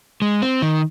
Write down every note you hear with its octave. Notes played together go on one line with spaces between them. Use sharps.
G#3
C4
D#3